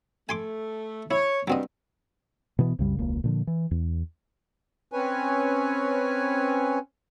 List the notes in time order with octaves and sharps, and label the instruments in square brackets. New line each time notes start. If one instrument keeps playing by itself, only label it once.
[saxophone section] A3 [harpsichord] G#5 C6 D6
[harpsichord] E4 [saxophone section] C#5
[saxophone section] G2 [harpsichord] F#3 C4 D#5
[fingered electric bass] B2 E3 B3
C2 F#2 C#3 G3
E1 C#2 A#3
A#2 D3 F3
E3
E2
[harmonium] C4 C#4 B4 C#5 G#5